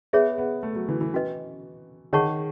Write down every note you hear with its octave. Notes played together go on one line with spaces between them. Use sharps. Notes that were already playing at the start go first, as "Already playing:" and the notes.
B3 G#4 C#5 E5
B3
A3
F#3
E3
E3
C#4 F#4 B4 D#5
D#3 G#4 C#5 F#5 A5 C#6